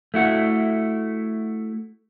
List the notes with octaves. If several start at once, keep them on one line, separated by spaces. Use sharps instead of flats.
A3 E4 F#4